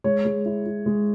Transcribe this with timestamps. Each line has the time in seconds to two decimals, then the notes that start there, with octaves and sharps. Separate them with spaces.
0.04 G#3 C#5
0.25 G#3
0.45 E4
0.66 E4
0.86 G#3